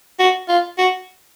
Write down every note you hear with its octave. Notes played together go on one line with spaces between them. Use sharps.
F#4
F4
F#4